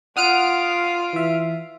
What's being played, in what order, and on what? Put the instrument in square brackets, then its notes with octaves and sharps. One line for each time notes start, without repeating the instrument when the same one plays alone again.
[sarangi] F4 [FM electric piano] F#5 [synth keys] D#6 F6 D7
[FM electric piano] E3 E5